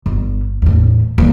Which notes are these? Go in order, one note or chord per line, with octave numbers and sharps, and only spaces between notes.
G1
E2 A2
D#2 G3